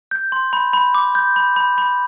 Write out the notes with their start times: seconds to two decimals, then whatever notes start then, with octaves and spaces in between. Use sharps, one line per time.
0.11 G6
0.32 C6
0.53 B5
0.73 B5
0.95 D6
1.15 G6
1.36 B5
1.56 B5
1.78 B5